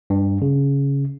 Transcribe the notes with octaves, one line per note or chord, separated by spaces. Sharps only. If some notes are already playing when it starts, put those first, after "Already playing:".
G2
C#3